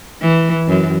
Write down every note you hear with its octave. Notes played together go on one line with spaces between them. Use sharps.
E3
F#2